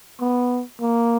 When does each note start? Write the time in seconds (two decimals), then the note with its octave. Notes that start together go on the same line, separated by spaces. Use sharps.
0.21 B3
0.80 A#3